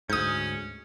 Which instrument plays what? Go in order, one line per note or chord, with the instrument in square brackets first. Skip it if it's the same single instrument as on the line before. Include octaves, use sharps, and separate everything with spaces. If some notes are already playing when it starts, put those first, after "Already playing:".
[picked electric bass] D2 G#2 [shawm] C#4 [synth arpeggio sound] D#6 G6